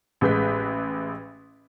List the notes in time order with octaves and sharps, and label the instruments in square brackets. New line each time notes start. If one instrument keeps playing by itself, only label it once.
[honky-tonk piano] A1 G#3 B4 G6 B6